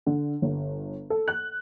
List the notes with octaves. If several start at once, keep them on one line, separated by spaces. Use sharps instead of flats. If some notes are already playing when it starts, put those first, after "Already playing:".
D3
G1
A4
F#6